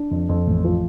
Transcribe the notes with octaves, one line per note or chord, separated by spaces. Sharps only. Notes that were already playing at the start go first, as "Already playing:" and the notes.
Already playing: D4
F2
F2
A1
F3